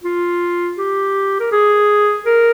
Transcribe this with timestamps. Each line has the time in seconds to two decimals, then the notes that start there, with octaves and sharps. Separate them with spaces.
0.04 F4
0.78 G4
1.40 A#4
1.52 G#4
2.26 A#4